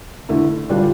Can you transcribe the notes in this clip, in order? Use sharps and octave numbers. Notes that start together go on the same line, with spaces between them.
D3 A3 E4
D3 G3 D4 F4